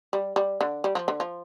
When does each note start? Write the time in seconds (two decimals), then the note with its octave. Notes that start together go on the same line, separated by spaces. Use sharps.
0.13 G3
0.36 G3
0.61 D3
0.84 G3
0.95 F3
1.08 D3
1.20 F3